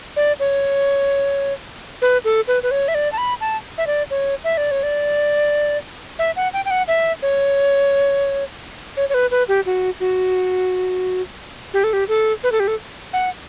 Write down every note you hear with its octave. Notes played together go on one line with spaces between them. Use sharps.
D5
C#5
B4
A4
B4
B4
C#5
E5
D5
A5
B5
A5
E5
D5
C#5
E5
D5
C#5
D5
E5
F#5
G5
G5
F#5
E5
C#5
C#5
C#5
B4
B4
G4
F#4
F#4
G4
A4
G4
A4
B4
A4
G4
A4
F#5